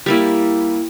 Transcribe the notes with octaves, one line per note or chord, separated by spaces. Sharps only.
G3 A#3 E4